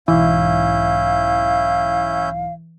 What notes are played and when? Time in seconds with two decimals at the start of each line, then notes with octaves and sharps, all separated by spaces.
0.08 B1 G#2 E3 C#4 E4 F5 G6